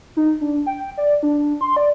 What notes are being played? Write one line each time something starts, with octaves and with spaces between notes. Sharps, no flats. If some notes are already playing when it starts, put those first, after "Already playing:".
D#4
D4
G5
D5
D4
C6
D5